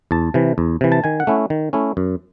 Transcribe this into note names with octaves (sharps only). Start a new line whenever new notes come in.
E2 A5
C3 E3
E2
C3 E3
A5
D#3 G#5
F#5
A3 C#4 E4
D#3
A3 C#4 E4
F#2